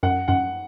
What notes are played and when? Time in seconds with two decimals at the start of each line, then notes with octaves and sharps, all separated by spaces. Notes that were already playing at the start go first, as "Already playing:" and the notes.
0.03 F#2 F#5
0.28 F#2 F#5